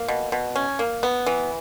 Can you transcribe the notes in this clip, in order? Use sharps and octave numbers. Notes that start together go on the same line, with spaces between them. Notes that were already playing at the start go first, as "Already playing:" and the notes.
Already playing: A#3
B2
B2
C#4
A#3
B3
E3